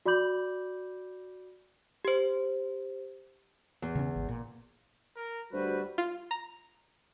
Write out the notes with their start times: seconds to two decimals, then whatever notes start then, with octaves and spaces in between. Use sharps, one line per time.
0.06 F#4 D5 B5 D6 G6 F#7
2.05 G4 C5
3.82 E2
3.95 C#3 C4 C#4
4.16 G#1
4.29 A#2
5.16 A#4
5.53 D2 G3 F#4 B4 C5
5.98 F4
6.31 A#5